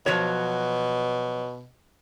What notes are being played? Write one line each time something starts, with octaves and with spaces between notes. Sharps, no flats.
B2 F3 F#3 C#5